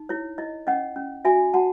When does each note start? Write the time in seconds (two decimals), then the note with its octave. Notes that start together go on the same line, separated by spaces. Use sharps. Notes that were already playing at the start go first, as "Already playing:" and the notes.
Already playing: D#4
0.09 E4 C#5
0.38 E4 D#5
0.67 C#4 D#5 F#5
0.96 C#4
1.25 F#4 E5 G#5
1.53 F#4 F#5 A5